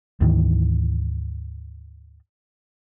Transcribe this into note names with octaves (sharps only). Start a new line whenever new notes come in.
D2 G#2 D#3 E3